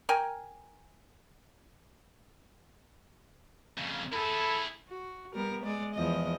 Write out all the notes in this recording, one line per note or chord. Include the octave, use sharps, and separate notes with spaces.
A#4 G5 G#5
F2 C#3
E4 G#4 A4 B5
F#4
G3 B3 A#4
G#3 D5
E2 F3 D#5